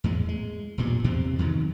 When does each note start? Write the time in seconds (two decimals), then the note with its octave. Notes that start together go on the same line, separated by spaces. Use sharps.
0.04 E2 A2 G#3
0.29 G#3
0.78 E1 G2 A#2
1.04 E2 C3 C4
1.39 E2 D#3 F#3